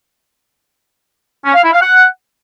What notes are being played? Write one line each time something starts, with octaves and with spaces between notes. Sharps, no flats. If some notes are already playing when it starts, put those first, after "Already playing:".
C#4
F5
E4
F5
F#5